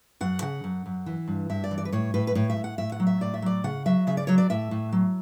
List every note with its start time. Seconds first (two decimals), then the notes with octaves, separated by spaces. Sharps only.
0.21 F#2 F#5
0.42 C#3 F#5
0.64 F#2
0.86 F#2
1.06 E3
1.27 G2
1.49 G2 E5
1.64 D5
1.71 E3
1.78 D5
1.85 B4
1.92 A2 C#5
2.14 A2 B4
2.27 B4
2.35 A2 C#5
2.50 E5
2.57 A2
2.64 F#5
2.78 A2 E5
2.92 F#5
3.00 F#3
3.07 E5
3.21 A2 D5
3.34 E5
3.42 F#3 D5
3.64 C#3 F#5
3.86 F#3 E5
4.07 C#3 E5
4.17 D5
4.27 F#3 C#5
4.38 D5
4.50 A2 E5
4.71 A2
4.92 F#3